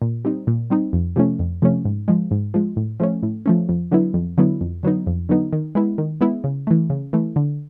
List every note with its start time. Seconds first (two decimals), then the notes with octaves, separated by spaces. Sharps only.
0.02 A#2
0.25 G3 C4 D#4
0.47 A#2
0.70 G3 C4 D#4
0.93 F2
1.16 C3 F3 A3 C#4
1.39 F2
1.62 C3 F3 A3 C#4
1.85 G#2
2.08 F3 G#3
2.31 G#2
2.54 F3 G#3
2.77 A2
3.00 F3 A3 C#4
3.23 A2
3.46 F3 A3 C#4
3.69 F2
3.91 D3 F#3 B3 E4
4.14 F2
4.38 D3 F#3 B3 E4
4.61 F2
4.83 D3 F#3 B3 D#4
5.07 F2
5.29 D3 F#3 B3 D#4
5.53 D#3
5.75 G#3 B3 E4
5.98 D#3
6.21 G#3 B3 E4
6.44 C#3
6.67 E3 A3
6.90 C#3
7.13 E3 A3
7.36 D3